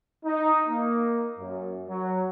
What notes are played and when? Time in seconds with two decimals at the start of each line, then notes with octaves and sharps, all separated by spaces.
0.25 D#4
0.68 A#3
1.38 F#2
1.89 F#3